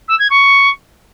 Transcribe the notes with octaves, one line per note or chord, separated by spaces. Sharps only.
E6
G#6
C#6